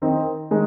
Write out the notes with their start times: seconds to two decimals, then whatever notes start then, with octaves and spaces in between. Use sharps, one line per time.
0.02 D#3 C4 D#4
0.51 D#3 G#3 D#4